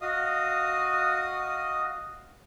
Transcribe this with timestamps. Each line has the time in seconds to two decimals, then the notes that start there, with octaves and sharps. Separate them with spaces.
0.01 F#4 D#5 F5 D#6